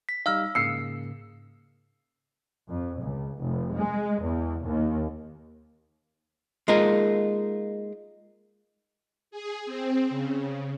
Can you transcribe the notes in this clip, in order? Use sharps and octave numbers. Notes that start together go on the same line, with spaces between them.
B6
G3 D#4 F5 E6 F6
G#2 C#3 A#3 E6 C7 C#7
F2
C#2
F1
G#3
E2
D#2
G#3 A#3 D#4 F4 A#4
G#4
C4
C#3